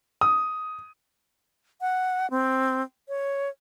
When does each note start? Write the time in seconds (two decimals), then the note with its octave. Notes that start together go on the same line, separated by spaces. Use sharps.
0.21 D#6
1.81 F#5
2.30 C4
3.08 C#5